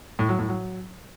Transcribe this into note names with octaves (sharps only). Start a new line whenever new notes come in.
A2
F#3
A2
F#3